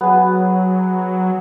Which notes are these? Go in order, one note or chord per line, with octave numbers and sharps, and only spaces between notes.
F#3 B3 G#4